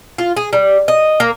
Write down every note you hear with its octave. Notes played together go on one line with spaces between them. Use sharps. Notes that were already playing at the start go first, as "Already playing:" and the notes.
F4
G#4
G3
D#5
A#3